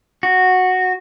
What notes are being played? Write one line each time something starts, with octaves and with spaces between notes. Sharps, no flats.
F#4